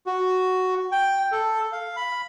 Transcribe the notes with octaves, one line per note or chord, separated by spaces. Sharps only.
F#4
G5
A4
F5
B5